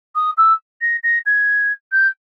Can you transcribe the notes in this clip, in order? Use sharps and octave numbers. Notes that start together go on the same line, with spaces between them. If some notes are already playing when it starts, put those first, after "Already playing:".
D#6
E6
A#6
A#6
G#6
G6